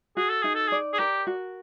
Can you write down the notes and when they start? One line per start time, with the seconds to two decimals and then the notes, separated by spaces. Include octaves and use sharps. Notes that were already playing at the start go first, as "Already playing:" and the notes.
0.17 F#4 G#4
0.29 A4
0.42 D#4 G#4
0.55 A4
0.68 G#4 D5
0.93 G#4
0.99 G4 A#4
1.27 F#4